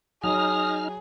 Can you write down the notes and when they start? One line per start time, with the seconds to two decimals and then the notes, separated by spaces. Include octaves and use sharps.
0.24 F#3 D#4 G#4 D#6 F6